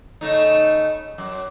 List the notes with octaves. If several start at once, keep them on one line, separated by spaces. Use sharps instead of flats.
C#3 A3 D#4
F#2